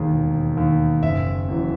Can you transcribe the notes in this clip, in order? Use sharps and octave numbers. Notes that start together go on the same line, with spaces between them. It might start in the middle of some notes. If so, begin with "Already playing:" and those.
Already playing: E1 D#2 D#3 G#4
E1
D#2 D#3
F#1 E5
F#2 E3